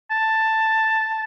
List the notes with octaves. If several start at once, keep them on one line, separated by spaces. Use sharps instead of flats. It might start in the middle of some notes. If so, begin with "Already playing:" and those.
A5